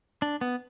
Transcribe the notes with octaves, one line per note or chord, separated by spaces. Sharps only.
D4
B3